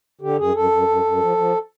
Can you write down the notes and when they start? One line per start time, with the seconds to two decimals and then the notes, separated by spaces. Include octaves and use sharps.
0.21 D3 G4
0.38 F#2 G#4
0.55 F#2 A4
0.71 F#2
0.88 F#2
1.04 F#2
1.20 F3
1.37 F3